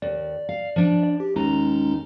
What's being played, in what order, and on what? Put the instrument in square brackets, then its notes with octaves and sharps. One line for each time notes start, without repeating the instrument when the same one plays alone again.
[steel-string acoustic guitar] D#2 [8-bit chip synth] D5
[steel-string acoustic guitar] F5
F3 D4
[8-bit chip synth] G4
[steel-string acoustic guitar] D#2 A#5 [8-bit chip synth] G#3 C#4 D#4